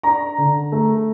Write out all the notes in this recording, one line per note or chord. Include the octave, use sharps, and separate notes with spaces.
D4 A#5
D3
A3